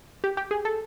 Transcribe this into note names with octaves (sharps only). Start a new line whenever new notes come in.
G4
G4
G#4
A4